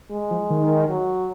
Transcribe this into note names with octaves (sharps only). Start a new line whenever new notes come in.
G#3
F3
D#3
F#3